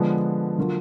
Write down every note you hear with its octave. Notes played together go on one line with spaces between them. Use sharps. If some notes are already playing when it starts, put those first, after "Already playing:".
Already playing: D3 F3 G#3 B3 D4
D3 F#3 A#3 F4